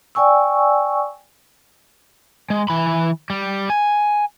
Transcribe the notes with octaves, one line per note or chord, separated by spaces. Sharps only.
D5 G5 G#5 C#6 E6
G#3
E3 B5
G3
G#5